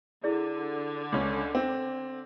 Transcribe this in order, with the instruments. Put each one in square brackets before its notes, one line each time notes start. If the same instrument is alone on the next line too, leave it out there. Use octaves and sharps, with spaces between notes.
[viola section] D3 [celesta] E4 G#4 D5
[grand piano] C#2 C#4 [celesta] D6
[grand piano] C4